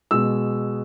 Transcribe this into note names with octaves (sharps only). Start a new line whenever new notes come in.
B2 G#3 E6